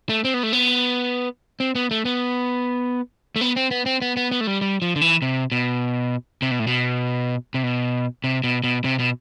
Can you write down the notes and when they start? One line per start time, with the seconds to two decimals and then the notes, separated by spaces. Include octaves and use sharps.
0.09 A3
0.25 C4
0.34 B3
0.43 A3
0.53 B3
1.60 C4
1.75 B3
1.91 A3
2.05 B3
3.36 A3
3.41 B3
3.56 C4
3.71 B3
3.86 C4
4.02 B3
4.17 B3
4.32 B3
4.41 A3
4.47 G3
4.61 G3
4.82 F3
4.96 D3
5.01 E3
5.22 C3
5.52 B2
6.42 C3
6.51 B2
6.60 A2
6.67 B2
7.54 C3
7.63 B2
8.24 C3
8.44 B2
8.64 B2
8.84 C3
8.99 B2